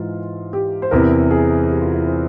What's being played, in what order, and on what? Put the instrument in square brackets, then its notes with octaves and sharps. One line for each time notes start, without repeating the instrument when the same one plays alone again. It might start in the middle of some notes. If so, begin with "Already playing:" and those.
Already playing: [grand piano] G#2 E3 F4
G4
C5
E2 C3 E3 A#4
G#4
G4
F4
E4
C4